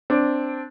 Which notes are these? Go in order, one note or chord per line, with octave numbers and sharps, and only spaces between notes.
C4 D4